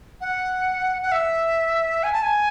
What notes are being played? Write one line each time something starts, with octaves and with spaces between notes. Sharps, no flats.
F#5
F#5
E5
G#5
A5
G#5